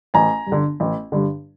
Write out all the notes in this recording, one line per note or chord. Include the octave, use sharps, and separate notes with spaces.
A1 G#5 A#5
G2
D3
A1
G2 D3